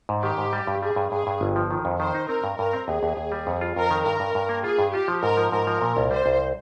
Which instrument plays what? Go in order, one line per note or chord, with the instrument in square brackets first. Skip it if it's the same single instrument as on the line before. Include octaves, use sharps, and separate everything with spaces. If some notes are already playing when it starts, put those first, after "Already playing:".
[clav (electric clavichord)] G#2
[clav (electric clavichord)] D#3 [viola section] G4
[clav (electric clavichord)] G#2
G3
G2
[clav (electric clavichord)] G3 [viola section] G#4
[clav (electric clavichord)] G2
[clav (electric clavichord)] G2 [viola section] G#4
[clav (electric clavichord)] G2
G1
F3
D#3
F2
[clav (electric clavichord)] D#3 [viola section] C5
[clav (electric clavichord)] D#4
[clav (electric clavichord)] C4 [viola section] A#4
[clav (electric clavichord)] G2
[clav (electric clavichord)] G2 [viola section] A#4
[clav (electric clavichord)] C4
[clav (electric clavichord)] D#2 [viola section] G#4
[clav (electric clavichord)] D#2
D#2
G3
F2
F4
[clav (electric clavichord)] F2 [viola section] A#4
[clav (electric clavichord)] D#3
[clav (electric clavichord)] G2 [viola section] A#4
[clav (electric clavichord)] G2
G2
A#3
[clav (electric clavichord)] F4 [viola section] G#4
[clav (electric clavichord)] G2
[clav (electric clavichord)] F4 [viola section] G4
[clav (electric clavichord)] F3
[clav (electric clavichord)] G#2 [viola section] A#4
[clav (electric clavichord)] F3
[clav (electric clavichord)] G#2 [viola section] A#4
[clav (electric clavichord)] F3
A#2
C2
[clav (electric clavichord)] G3 [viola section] C5
[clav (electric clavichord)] C2